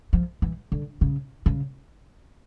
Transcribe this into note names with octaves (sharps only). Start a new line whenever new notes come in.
F3
E3
D3
C#3
C#3